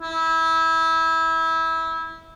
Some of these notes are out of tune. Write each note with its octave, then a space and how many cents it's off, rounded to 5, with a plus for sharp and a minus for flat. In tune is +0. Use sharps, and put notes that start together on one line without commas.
E4 -20